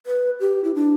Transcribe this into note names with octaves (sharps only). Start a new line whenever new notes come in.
B4
G4
E4
D4